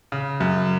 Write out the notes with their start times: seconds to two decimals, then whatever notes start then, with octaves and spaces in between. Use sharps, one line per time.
0.12 C#3
0.40 F#2